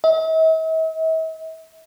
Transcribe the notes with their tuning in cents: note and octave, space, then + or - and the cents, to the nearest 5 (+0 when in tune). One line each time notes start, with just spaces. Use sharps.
E5 -45